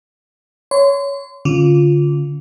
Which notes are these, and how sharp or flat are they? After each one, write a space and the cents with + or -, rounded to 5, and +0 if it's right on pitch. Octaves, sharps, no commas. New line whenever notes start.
C#5 +10 C6 -30
D3 -25 C#4 -15 F4 +0